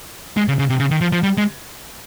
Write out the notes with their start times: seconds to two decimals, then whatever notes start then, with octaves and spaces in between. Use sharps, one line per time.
0.37 G#3
0.48 C#3
0.59 C#3
0.69 C3
0.80 C#3
0.91 D#3
1.01 F3
1.12 F3
1.23 G3
1.38 G#3